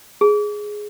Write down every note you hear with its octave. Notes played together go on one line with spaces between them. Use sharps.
G#4